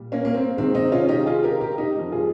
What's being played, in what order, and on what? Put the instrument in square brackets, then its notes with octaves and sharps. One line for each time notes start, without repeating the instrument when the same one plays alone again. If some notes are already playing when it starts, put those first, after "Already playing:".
Already playing: [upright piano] A#2 G3
A#3 C#4
A#3
C4
C3 D#3 G#3 C4
C4 D#4
C#4 F4
D#4 G4
F4 G#4
G4 A#4
G4 A#4
D#4 G4
F2 D#3 G3
F4 G#4